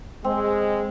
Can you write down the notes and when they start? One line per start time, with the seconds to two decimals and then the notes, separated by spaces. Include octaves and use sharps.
0.24 G#3 C4